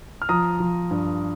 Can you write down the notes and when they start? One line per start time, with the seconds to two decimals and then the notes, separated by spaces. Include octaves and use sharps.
0.22 F6
0.29 F3 A#5 D#6
0.60 F3
0.91 G2